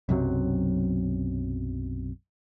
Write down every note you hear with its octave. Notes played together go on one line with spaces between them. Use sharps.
B1 F#2 C3 F#3